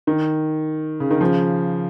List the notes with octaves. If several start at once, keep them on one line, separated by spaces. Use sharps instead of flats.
D#3
C#3
D#3
C#3 F3